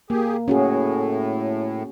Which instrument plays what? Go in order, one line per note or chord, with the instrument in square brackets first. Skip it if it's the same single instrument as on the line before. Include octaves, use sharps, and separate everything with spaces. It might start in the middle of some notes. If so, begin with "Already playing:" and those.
[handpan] A#3 [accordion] G4 G#4
[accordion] A2 [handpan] C#4 F#4 G#4